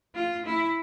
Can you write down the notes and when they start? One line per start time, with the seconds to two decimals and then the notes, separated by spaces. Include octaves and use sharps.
0.15 F4
0.46 E4